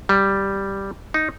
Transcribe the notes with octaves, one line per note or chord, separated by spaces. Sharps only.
G3
D#4